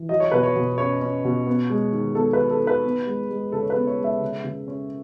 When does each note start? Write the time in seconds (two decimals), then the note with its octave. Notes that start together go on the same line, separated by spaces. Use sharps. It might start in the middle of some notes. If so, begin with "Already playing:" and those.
Already playing: E3
0.09 F#3 D#5
0.20 C#5
0.32 B2 B4
0.43 C#5
0.56 B2
0.78 C#4 C#5
1.01 C#4
1.25 B2
1.47 B3
1.70 G#3
1.93 D#3
2.15 B3 A4
2.33 D#3 B4
2.50 A4
2.61 D#3
2.67 B4
2.85 B3
3.07 G#3
3.30 G#3
3.52 C#3 A4
3.62 C#5
3.70 B4
3.76 B3
3.87 C#5
3.99 G#3 E5
4.21 C#3
4.44 C#3
4.68 C#4